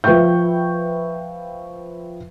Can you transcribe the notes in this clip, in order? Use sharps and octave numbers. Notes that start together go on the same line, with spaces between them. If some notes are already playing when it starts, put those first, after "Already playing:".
F3 B4 E5 G5 C#6 G6